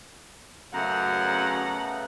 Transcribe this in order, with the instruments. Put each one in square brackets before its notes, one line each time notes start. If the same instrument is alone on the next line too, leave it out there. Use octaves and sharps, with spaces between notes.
[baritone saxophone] F#2 [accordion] C#3 A3 B3 [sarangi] F#5 [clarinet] A#5